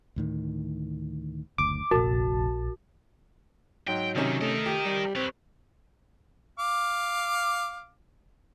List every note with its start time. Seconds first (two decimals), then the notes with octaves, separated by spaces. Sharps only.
0.16 D2 A2 D#3
1.58 F#1 D2 D6
1.91 F1 A#1 F#4 A5
3.88 G#2 F#3 G5
4.16 C3 D#3 C#4 D#4
4.41 A3 A#4 D#5
4.66 G4
4.85 G3
5.16 C4 B4 C#5
6.59 F5 D6